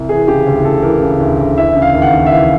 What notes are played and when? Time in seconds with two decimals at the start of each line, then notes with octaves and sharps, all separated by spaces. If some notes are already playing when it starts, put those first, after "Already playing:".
Already playing: C2
0.09 E3 G#4
0.28 C#3 G4
0.46 D2
0.65 D2 A4
0.83 E3 A#4
1.01 C#3
1.20 D2
1.39 D2
1.57 E3 E5
1.76 C#3
1.82 F5
1.95 D#2
2.02 F#5
2.07 F5
2.13 D#2
2.26 E5
2.31 E3 F5